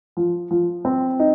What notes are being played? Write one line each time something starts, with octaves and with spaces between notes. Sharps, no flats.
F3
F3
C4
D#4